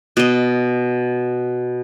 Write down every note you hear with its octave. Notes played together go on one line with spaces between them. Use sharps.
B2 D#5